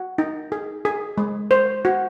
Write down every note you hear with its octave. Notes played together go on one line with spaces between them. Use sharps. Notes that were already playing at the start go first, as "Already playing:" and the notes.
Already playing: F#4
D#4
G#4
G#4
G#3
C5
F#4